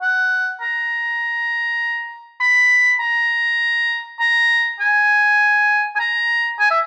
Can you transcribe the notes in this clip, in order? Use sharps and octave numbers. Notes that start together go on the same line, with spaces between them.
F#5
A#5
B5
A#5
A#5
G#5
G#5
A#5
G#5
E5